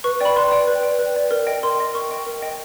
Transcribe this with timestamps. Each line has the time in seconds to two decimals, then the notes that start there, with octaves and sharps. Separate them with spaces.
0.04 B4 C#6
0.20 D5 G5 B5
0.36 B4 C6
0.51 D5 G5
0.67 B4
0.83 D5 G5
0.99 B4
1.16 D5 G5
1.31 A#4
1.47 D#5 G5
1.63 A#4 C6
1.79 D#5 G5
1.94 A#4 C#6
2.11 D#5 G5
2.26 A#4
2.42 D#5 G5